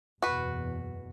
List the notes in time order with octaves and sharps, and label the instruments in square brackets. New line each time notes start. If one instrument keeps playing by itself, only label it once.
[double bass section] F#1 E2 B2 [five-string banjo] F#4 B4